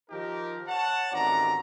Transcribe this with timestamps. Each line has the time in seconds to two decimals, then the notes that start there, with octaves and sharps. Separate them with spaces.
0.11 D#3 F3 D#4 G4 A#4
0.68 C#5 F#5 A5
1.13 A1 D#3 C4 F#4 D5 A#5